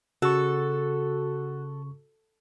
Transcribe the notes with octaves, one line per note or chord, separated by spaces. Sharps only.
C#3 F#4 A4 C#6